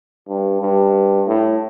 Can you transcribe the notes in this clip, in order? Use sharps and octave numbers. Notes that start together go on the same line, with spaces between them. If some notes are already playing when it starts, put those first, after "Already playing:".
G2
G2
A2